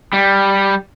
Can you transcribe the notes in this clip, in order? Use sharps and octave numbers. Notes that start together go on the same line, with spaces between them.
G3